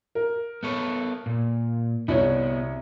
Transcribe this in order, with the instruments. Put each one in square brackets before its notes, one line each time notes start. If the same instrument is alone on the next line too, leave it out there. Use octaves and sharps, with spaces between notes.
[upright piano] A#4
[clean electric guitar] B3 A4 C#5
A#2
[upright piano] C2 C#5 [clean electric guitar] C3 B3